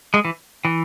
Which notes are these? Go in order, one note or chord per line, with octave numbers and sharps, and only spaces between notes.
G#3
E3
E3